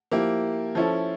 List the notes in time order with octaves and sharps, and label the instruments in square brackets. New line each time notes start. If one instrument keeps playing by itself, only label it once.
[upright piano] F3 A#3 E4 G4
F3 C#4 E4 A4